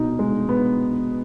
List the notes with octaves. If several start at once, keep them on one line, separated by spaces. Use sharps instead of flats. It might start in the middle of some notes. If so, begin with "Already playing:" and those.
Already playing: B2 D#4
G#3
B3